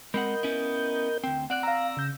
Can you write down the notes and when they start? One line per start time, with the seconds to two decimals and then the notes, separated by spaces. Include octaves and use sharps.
0.14 G#3 C4 A#4 D#5 F#5 B5 G6
0.43 B3 C#4 E4
1.24 D2 C4 G5
1.50 C4 D5 F#5 F#6
1.63 F5 A#5 E6 A#6
1.97 C#3 G6